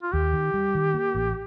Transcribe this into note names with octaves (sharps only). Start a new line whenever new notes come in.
F4
D#2 G4
D#3
G3
D#3
A#3
A1